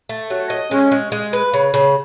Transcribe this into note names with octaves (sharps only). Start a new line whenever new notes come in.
A3
F#3
D#5
G#3 C#4
G#3
G#3
B4
C#3
C#3